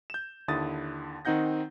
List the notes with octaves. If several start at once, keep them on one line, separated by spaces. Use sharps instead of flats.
G6 E7
D#2 D3 E4 D#6 A6
D#3 C4 D#4 F#5 G6 A#6